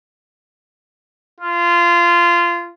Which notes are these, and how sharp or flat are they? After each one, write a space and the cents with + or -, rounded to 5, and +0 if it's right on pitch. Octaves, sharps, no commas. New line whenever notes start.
F4 -20